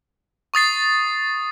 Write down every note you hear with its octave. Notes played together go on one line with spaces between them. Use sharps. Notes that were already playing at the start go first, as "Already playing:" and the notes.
C#6 D#6 A6 C7